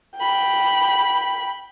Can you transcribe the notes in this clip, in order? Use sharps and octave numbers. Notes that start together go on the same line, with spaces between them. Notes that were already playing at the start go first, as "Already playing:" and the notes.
G5 B5